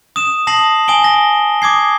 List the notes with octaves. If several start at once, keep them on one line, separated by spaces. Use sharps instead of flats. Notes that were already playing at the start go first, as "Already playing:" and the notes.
D#6 E7
A5 D#6 A#6 C7 F#7
G#5 D#6 D7 G7
A#6
D6 D#6 G#6 C7